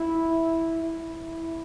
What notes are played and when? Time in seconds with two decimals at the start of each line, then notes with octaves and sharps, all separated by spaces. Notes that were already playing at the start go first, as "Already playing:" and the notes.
Already playing: E4
0.84 E4